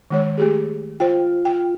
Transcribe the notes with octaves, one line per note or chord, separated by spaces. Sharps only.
D#3 G#3 C#5
A3 G4 G#4
F4 C5 G5
G5